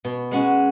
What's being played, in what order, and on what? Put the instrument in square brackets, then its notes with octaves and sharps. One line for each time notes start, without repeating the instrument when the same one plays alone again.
[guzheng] B2
G#3 C#4 F#4